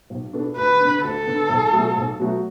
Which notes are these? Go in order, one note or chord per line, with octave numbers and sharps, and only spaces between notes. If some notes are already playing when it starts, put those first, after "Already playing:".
B1
B2 B3 D4 A4
D2 B4
D3 B3 D4
D2 A4
D3 B3 D4
B1
B2 F#3 A3 F#4
B1
B2 F#3 A3 F#4